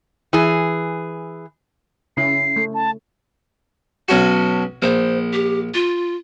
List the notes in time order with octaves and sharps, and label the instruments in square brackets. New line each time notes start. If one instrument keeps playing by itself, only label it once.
[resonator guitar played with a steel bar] E3 G#4
[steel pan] C#3 C#4 E4 [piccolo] C7
[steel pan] A3
[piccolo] A5
[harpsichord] B1 C#4 F#4 [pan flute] A5
[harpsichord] A#1 [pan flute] C5
[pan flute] G4
F4